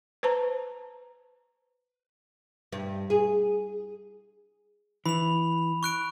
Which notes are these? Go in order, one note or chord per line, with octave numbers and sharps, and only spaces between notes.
B4 C5 A5 A#5
G2
G#4
E3 B5 F7
C#6 F#6 D7